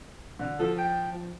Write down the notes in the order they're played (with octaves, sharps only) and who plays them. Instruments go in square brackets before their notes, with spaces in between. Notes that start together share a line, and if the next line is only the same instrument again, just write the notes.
[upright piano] D3
[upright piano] F3 [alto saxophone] A4
[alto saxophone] G5
F3